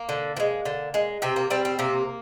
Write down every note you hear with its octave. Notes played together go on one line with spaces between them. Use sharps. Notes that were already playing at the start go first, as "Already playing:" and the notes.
Already playing: A#3
D3
F3
G#3
D3
G#3
C3 C4
A#3
G3 C4
C4
C3 A#3